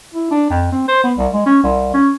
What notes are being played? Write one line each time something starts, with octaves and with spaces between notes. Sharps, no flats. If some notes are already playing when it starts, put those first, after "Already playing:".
E4
D4
F2
C4
C5
B3
C2
G#3
C#4
C2
C#4